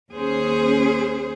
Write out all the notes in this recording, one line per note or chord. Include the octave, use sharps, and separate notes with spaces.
D#2 C#4 G#4 C5